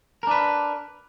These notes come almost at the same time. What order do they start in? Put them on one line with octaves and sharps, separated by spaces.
A#4 D4 B4